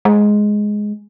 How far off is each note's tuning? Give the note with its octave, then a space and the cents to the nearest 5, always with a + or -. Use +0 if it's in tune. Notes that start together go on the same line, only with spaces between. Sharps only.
G#3 +5